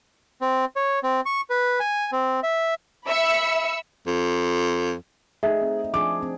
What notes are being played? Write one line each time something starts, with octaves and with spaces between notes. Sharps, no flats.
C4
C#5
C4
C#6
B4
G#5
C4
E5
E5 B5 E6 C#7
F2
A3 D#4 G#4 E5
C4
F3 D4 G#4 D6
C4